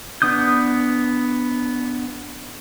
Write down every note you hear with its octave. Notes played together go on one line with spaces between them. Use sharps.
B3 D4 D#6 G6